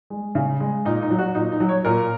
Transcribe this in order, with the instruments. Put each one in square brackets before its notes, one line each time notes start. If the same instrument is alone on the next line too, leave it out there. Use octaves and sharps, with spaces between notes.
[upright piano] G#3
C#3
G#3
A#2 D#4
D#4
F#3
F#4
A#2 D#4
D#4
F#3
C#5
A#2 A#4